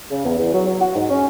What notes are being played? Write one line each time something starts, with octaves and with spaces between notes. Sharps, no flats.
C#3
E2
E2
F#3
F#3
F#4
G#2
C#4